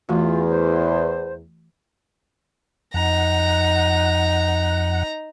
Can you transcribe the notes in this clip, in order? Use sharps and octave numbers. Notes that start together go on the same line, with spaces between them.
E2 E3 A3 F4 F#4
C5
F2 D#4 F#5 A#5